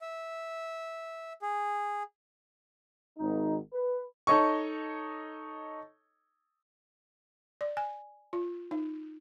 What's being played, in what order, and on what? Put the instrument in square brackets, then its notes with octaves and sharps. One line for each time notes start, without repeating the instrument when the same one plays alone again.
[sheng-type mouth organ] E5
G#4
[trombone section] G#1 D#4
B4
[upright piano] D#4 A4 C#5 D#5 C#6
[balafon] D5
G#5
F4
D#4